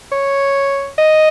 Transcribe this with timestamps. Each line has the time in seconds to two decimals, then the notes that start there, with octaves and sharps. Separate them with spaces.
0.12 C#5
0.98 D#5